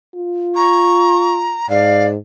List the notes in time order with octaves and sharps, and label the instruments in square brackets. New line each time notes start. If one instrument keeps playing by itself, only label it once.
[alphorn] F4
[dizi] A#5 [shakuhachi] C#6
[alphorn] G#2 [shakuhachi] D5 [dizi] F5